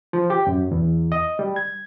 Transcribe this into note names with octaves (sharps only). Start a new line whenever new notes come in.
F3
G4
F#2
E2
D#5
G3
G#6